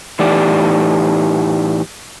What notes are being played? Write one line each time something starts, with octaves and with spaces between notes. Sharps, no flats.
A2 E3 A3 D#4 G4 D5